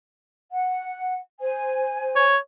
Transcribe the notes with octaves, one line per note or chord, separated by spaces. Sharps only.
F#5
C5 G#5
C#5